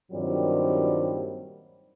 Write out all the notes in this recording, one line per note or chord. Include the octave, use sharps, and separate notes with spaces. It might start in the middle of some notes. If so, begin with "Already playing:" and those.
G2 A#2 D#3 F#3 G3 C4